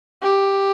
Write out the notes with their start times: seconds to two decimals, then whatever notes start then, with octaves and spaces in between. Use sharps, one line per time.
0.23 G4